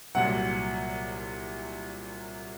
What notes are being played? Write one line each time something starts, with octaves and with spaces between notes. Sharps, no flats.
C2 A#2 F#3 F#5